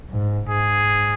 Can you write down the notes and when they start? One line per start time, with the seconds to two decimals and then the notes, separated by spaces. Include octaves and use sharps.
0.10 G#2
0.49 G#2 G#4